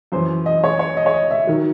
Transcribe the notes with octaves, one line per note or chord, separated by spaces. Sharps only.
F#2 E3 C5
D#5
C#5
C#5
D#5
C#5
D#5
E5
D#3 F#3